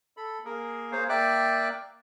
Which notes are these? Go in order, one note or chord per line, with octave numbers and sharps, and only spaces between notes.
A4 B5
A#3 G#4 A#4
A#3 G#4 C5 C#5 F5
A#3 D5 E5 G5 D6 F#6